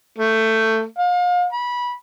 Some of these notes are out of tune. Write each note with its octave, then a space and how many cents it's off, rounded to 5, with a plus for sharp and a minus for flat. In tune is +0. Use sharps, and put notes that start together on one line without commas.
A3 +15
F5 +35
B5 -20